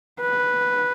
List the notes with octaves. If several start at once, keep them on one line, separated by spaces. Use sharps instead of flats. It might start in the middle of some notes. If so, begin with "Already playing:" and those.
B4